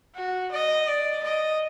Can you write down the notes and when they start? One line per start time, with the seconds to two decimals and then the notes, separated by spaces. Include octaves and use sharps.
0.15 F#4
0.51 D#5
0.87 D5
1.23 D#5